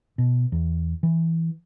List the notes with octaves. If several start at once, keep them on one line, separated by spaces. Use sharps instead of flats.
B2
E2
E3